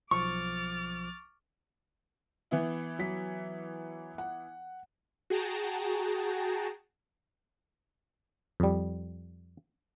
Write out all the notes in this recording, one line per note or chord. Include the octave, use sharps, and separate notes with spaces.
B1 F3 C#6 D6 F6 A6
E3 B3 E4
F#3 B6
F#5
F#4 G#4 G5 A5 A#5
F2 G3